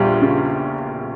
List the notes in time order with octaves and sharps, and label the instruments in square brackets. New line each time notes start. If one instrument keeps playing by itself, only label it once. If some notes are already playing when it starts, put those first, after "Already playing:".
Already playing: [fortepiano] A#1 E2 G3 F4
C#3